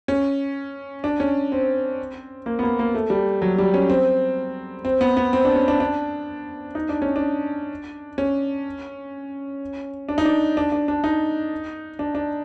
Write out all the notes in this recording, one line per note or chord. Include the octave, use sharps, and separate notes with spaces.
C#4
D4
C#4
C4
A#3
B3
A#3
A#3
A3
G3
F#3
G3
C#4
C4
C4
B3
B3
C4
D4
C#4
D4
D4
D#4
D4
C#4
D4
C#4
D4
D#4
D4
D4
D4
D4
D#4
D4
D4